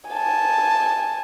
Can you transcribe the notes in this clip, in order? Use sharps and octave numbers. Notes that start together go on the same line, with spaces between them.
G#5 A5